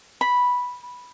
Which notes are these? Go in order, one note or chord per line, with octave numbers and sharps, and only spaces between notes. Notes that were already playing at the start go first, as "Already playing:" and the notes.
B5